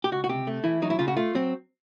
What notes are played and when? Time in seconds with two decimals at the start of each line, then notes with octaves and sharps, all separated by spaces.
0.04 G4
0.12 C#2 F#4
0.24 F#4
0.29 C3 G4
0.47 A3
0.64 E3 E4
0.82 F#3 D#4
0.90 E4
0.99 C#3 F4
1.08 F#4
1.17 A3 F4
1.35 F#3 C4